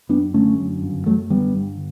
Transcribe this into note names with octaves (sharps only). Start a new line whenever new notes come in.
F#2 B3 D4
D3 A3 C#4
F#2
G1
F#2 F#3 A3
D3 G3 B3
G1